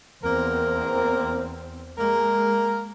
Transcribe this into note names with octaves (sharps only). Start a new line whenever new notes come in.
E2 A#3 C4 A#4
G#3 A#3 A#4